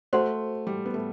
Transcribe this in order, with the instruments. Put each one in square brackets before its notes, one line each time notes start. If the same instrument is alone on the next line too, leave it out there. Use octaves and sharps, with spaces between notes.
[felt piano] A3 [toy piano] F#4 C5 F#5 C6
[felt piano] G3
B3
A3